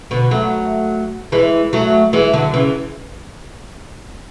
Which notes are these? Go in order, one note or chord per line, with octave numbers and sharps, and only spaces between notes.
B2 D3
F#3 A3
E3 G#3
F#3 A3
E3 G#3
D3 F#3
C#3 E3